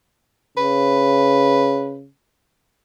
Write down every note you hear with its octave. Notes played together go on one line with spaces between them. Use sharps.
C#3 B4